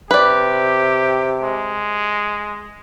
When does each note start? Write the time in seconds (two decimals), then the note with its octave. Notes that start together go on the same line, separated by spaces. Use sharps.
0.11 C3 G4 B4 D5
1.42 G#3